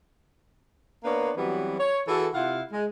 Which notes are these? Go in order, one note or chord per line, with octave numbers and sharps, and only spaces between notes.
A#3 B3 D4 A#4 B4 C#5
E3 F#3 G3 B3 C4 F#4
C#5
E3 F#4 G#4 A4
C3 E4 F4 F5 F#5
G#3